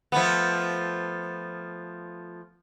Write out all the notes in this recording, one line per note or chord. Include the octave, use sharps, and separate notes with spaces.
F3 A3 B3